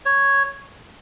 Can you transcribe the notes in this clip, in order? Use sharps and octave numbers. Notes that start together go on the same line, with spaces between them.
C#5